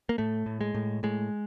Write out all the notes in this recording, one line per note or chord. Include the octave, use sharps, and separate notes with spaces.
A#3
A2 A3
A2
G#3
A2
A2 G#3